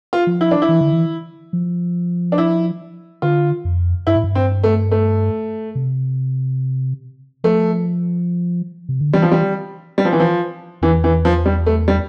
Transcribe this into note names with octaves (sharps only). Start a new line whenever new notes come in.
F4
F3
E4
D4
E4
E3
D3
E3
F3
D4
E4
D3 F4
F2
G2 E4
A2
G2
C4
A3
A3
C3
F3 A3
C3
D3
E3 G3
F3
G3
G3
F3
E3
F3
E2 E3
E3
F3
G3
A3
G3